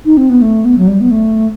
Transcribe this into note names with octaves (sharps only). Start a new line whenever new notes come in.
D#4
C4
B3
A3
B3
F#3
G3
B3
A3